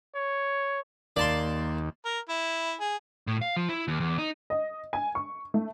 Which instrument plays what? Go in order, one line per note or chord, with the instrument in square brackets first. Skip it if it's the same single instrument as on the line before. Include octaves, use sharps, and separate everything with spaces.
[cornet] C#5
[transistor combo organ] D#2 [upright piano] A#3 [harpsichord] D5 A5 C6
[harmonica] A#4
E4
G#4
[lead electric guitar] A2
F5
F3
E4
D#2
E2
D#4
[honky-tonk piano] D#5
G#5
C#6
A3